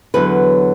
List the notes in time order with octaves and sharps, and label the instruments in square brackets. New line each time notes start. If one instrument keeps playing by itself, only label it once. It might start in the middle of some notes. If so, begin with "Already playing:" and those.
[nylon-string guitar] E2 D3 F#3 B4